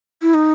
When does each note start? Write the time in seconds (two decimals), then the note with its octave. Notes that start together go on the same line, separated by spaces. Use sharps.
0.22 E4
0.34 D#4